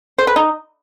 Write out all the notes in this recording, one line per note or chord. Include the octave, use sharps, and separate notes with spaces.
C5
B4
D#4